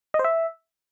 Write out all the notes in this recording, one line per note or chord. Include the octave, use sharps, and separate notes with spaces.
D#5
C5
E5